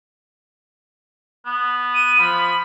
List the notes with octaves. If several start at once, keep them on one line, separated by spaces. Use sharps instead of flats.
B3
D#7
F3 B5